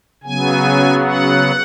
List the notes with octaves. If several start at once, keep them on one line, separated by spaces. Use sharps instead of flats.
C#3 F#3 B3 G#5
F#5